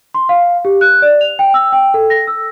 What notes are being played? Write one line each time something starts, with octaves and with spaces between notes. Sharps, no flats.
C6
F5
G4
F#6
D5
F7
G5
E6
G5
A4
A#6
E6